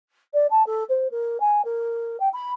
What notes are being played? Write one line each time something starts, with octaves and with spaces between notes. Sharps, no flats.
D5
A5
A4
C5
A#4
G#5
A#4
G5
B5